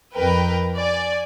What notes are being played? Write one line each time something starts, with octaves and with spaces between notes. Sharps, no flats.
F2 A#4 B4 G5
D5 G#5